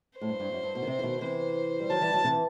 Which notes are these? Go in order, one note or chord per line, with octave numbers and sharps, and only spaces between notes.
A2 C5
G2
G2
F#2
G2
B2
D#3
C3
E3
B2 D#3
C3 E3 C5
G3
D#3 F#3 A5
E3 G3
D#3 F#3
C3 E3